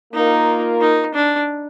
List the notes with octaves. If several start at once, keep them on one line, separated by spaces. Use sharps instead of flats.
A#3 D#4 F4 A#4
D#4
D4